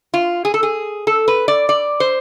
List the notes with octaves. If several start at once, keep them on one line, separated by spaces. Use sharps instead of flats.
F4
G#4
A4
G#4
A4
B4
D5
D5
C5